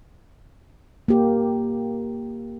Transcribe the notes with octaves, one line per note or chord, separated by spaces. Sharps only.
A#3 G4